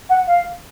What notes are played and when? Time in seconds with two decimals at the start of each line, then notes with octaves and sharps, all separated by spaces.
0.09 F#5
0.27 F5